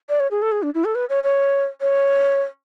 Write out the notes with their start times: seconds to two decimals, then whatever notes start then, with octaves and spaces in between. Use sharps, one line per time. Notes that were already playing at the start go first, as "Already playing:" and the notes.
0.09 D5
0.20 C#5
0.31 G#4
0.42 A4
0.52 G#4
0.63 D4
0.74 E4
0.85 A4
0.95 B4
1.09 C#5
1.24 C#5
1.81 C#5